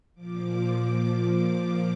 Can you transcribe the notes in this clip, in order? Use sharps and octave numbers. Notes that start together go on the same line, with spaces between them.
A#2 F3 D6
D6